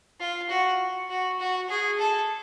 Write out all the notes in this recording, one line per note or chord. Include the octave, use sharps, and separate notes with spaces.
F4
F#4
F#4
F#4
G#4
A4